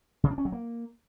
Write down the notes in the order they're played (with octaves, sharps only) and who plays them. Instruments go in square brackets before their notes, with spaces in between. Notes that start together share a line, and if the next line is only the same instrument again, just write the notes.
[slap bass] C#3
D4
C#4
F#3
A#3